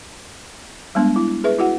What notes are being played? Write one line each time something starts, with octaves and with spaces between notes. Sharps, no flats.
G3 G#3 B3 D4
E4
G#4 B4 E5
E4 F#4 F#5